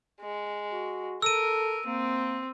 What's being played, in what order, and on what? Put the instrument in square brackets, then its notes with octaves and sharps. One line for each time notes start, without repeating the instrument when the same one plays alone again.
[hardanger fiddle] G#3
[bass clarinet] F#4
[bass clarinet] A4 [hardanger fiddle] A#4 [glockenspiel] E6 D#7
[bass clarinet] A#3 [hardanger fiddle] C4